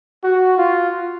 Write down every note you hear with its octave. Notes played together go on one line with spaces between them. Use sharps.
F#4
F4